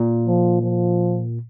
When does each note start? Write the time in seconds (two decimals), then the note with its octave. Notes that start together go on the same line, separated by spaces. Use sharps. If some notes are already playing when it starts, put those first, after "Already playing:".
Already playing: A#2
0.27 F3
0.62 F3